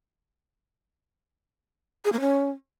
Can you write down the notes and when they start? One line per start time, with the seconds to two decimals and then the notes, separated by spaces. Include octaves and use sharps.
2.05 G#4
2.12 A#3
2.20 C#4